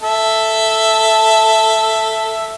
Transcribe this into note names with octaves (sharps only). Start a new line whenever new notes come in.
A4 E5